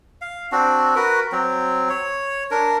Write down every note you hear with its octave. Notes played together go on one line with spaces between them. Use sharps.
F5
C4 D4 F#4
F#4 A#4 B4
F#3 C4
C#5
D4 A#4